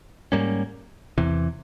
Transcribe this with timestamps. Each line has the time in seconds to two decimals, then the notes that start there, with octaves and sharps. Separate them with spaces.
0.32 G#2 G3 A#3 C#4
1.18 E2 C3 E3